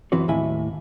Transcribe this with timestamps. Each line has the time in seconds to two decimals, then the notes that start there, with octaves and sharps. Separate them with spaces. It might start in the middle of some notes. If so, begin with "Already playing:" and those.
0.12 F#2 E3 C4 F#4 B4 C#5
0.28 D#2 A2 D#3 E4 G#5